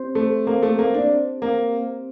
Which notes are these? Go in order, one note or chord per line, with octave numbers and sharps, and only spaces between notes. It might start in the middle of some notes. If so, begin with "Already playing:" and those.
Already playing: C4 G4 C5
A3
A#3
A3
A#3
D4
A#3